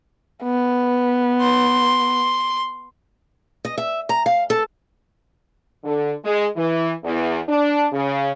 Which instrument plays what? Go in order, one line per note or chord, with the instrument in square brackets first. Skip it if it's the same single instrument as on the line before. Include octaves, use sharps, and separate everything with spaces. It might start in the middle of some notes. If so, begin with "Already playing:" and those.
[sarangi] B3
[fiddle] C6
[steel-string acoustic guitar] D#5
E5
A#5
F5
A4
[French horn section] D3
G#3
E3
E2
D4
C#3